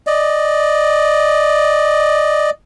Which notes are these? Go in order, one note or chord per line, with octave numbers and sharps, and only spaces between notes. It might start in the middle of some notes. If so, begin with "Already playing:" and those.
D5 D#5